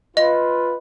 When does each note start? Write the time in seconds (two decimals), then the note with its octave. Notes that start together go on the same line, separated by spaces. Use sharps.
0.17 F4 B4 D#5